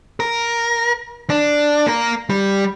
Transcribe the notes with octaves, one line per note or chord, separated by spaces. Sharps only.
A#4
D4
A#3 A#4
G3